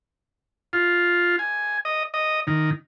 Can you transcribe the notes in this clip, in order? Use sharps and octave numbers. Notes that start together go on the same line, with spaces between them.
F4
G#5
D#5
D#5
D#3